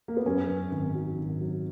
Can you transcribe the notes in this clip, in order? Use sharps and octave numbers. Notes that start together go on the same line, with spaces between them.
A#3
B3
F#2 C#4
F#2
G#1
F#3
G#1
F#3